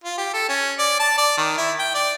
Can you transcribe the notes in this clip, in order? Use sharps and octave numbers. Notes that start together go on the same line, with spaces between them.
F4
G4
A4
C#4
D5
A5
D5
D#3
E4
G5
D5